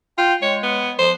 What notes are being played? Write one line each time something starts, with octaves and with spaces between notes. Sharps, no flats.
F4 G5
G#3 C#5
B3
F3 C5